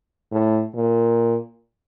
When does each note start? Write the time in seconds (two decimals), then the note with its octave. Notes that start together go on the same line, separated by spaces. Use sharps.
0.32 A2
0.75 A#2